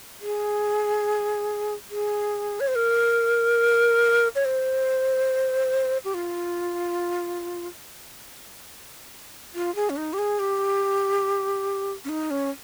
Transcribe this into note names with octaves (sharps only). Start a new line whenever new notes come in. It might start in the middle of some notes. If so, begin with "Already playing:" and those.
G#4
G#4
C#5
C5
A#4
C#5
C5
G4
F4
F4
G#4
C#4
D#4
G4
G#4
G4
C#4
D#4
C#4